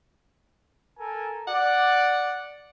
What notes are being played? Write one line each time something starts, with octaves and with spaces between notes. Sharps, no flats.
A4 A#4 G#5
D5 F#5